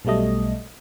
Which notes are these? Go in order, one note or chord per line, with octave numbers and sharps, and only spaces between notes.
B1 B2 G3 A3 D#5